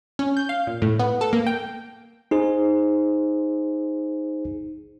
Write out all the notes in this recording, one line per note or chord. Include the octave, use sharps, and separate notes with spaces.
C#4
G6
F5
A#2
A2
B3
A4
A#3
G5
D#4 G#4 C5